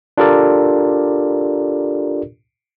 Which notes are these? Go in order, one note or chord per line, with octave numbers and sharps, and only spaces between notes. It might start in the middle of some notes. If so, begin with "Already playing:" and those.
D4 F4 G4 A4 A#4 D5